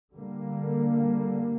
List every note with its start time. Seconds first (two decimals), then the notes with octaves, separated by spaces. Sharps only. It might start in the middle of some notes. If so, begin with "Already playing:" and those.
0.15 D3 G3 A#3